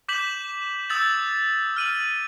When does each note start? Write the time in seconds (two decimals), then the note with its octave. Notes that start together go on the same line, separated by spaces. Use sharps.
0.08 D6 G6 B6 E7 F#7
0.90 D#6 E6 G6 A6 F#7
1.76 F6 D#7 F#7